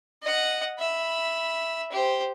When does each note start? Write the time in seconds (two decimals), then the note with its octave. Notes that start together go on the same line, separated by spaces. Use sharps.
0.22 D#5 F#5
0.79 E5 B5
1.92 G4 C5